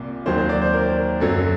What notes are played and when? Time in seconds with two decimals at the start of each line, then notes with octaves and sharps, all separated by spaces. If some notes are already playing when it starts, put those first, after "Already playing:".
Already playing: C2 A#2
0.26 D#2 D#3 F#3 C5
0.38 C5
0.49 D5
0.62 C5
0.73 A#4
1.20 F#2 F#3 A4